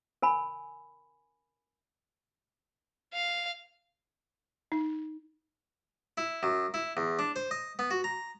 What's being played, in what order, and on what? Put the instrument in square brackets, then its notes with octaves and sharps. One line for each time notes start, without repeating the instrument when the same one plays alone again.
[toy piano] A#4 G#5 B5
[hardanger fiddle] F5
[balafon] D#4
[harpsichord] E4
F#2
E4
E2
D4
C5
D#5
B3
F#4
A#5